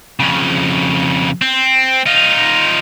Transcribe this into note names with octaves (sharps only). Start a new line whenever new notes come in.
F2 C#3
C4
D#4 F4